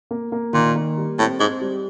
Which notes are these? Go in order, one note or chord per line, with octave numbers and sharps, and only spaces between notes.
A#3
A#3
A#2 D#3
A#3
G3
A2 C4
G#2 C4
G3